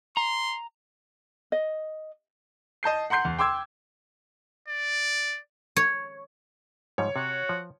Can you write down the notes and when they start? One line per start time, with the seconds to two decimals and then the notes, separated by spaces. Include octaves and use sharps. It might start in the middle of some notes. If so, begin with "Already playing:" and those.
0.17 A#5 C6
1.52 D#5
2.83 D#5 A5 G6 C7
3.10 F#5 A#5 C6 G6 C7
3.25 E2
3.38 G5 C6 D6 E6 G#6
4.68 D5
5.76 C#5
6.98 G#2 F3 G3 C#5
7.16 C3 F#4
7.49 F3